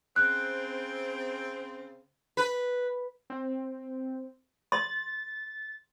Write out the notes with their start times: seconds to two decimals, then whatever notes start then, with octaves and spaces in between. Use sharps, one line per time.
0.16 C#3 C4 F#6
2.37 B4
3.30 C4
4.72 C6 A6